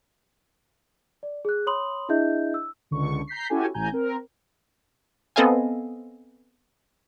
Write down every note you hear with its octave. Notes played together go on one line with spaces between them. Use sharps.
D5
G#4 F#6
C#5 B5 C6 D#6 F#7
D4 E4 G#4 D#5 E5 G6
E6
C#2 D3 C#6
A#5 G6 B6 C7
C#4 E4 F#4 G4 A4 G#5
A1 A2 G#5 A#5 G6
C4 A#4
B3 C4 A4 D#5 F5 G#5